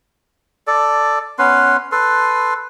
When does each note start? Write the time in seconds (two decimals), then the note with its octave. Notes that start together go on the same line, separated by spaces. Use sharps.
0.67 A4 D5
1.39 B3 C#4 B4 C6
1.92 A4 B4 C6